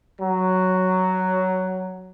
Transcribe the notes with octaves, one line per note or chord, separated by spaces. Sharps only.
F#3